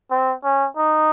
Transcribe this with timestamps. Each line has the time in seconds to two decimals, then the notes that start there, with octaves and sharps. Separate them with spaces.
0.11 C4
0.44 C#4
0.77 D#4